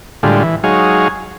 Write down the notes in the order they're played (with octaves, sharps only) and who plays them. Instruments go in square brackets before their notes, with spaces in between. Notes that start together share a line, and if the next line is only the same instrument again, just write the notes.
[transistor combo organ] A2 D3 G3 G#3 F4
E3
F#3 G#3 D#4 G#4 C#5 F5